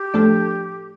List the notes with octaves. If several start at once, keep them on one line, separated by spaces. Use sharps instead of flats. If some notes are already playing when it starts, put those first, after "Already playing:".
Already playing: G4
A2 F3 A3 D4 A4